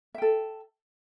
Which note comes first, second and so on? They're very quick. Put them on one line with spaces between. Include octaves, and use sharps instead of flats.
E5 G5 A4